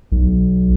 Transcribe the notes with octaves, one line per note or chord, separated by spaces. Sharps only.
B1